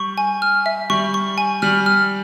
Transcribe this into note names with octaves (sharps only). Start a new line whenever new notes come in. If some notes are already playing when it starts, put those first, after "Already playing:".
Already playing: G3 C#6
G#5
F6
E5
G3 C#6
C#6
G#5
G3 F6
F6